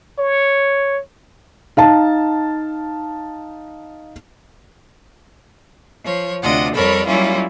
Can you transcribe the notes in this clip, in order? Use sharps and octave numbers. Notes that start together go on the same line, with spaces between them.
C#5
D#4 F5 A5
F3 C#5
D2 C3 D4 F4 D#5 F#5
F2 G3 A4 A#4 C#5 B5
F#3 G3 A#3 C#4 E4 F4